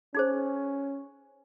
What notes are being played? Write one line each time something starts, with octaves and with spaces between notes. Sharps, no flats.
C#4 D#4 G#4 C5